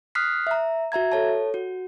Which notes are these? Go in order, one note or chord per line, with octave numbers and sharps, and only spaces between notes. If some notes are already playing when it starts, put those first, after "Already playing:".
D#6 F6 F#6 B6 C7
E5 A#5
F#4 E5 A#5 G#6
A4 C#5 A5
F#4